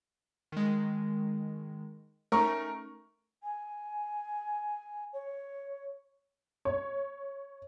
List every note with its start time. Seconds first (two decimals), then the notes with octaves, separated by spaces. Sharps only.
0.52 D#3 G#3
2.32 A3 C#4 D#4 A#4 C#6
3.43 G#5
5.13 C#5
6.65 C#5